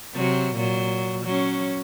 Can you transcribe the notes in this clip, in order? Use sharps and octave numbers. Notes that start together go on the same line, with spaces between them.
C3 F#3
A#2 F#3
F#3 C#4